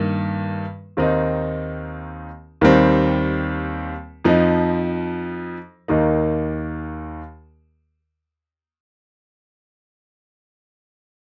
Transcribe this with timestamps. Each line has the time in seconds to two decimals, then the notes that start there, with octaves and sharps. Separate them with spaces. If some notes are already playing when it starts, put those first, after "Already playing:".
Already playing: G2 D#3 A#3
0.97 D#2 D#3 C4 D#4
2.61 D#2 D#3 G3 C4
4.25 F2 F3 D#4
5.88 D#2 D#3 A#3 D#4